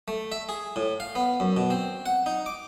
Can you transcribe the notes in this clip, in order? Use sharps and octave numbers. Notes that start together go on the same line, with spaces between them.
A3
E5
G#4
A2
F5
B3
F#2
B2
C4
F#5
D#4
D6